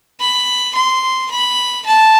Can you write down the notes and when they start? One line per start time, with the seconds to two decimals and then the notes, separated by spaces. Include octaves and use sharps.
0.20 B5
0.75 C6
1.30 B5
1.86 A5